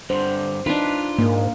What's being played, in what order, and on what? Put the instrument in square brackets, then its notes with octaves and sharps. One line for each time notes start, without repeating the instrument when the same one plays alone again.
[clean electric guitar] G2 D3 [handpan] C5
[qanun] D4 B4 [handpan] D#4 [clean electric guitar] F4
[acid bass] G#2 [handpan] A#3